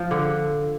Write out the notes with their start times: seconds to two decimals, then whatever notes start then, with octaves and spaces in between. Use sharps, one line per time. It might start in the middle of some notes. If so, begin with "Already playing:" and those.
Already playing: F3
0.11 D3